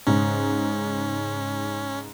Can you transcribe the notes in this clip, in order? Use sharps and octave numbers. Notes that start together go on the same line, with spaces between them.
G#2 C#3 C#4